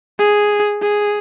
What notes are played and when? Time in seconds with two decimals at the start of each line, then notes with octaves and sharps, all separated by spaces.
0.19 G#4
0.81 G#4